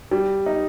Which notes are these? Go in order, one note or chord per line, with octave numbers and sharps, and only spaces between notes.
G3
D#4